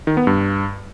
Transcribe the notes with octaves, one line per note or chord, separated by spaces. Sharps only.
D#3
B3
G2